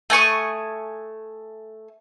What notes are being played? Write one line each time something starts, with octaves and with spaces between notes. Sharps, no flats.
A3 G#5 C#6 D#6